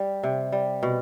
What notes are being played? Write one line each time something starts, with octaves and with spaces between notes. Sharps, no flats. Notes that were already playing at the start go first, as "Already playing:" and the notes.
Already playing: G3
C3
G3
B2